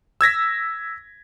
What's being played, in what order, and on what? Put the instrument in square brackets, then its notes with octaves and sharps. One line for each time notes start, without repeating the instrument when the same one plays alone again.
[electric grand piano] E6 G#6 A#6 B6